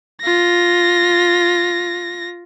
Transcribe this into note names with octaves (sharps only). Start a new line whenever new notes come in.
F4 A#6